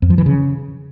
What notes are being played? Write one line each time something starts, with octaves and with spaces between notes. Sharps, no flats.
F2
F3
E3
C#3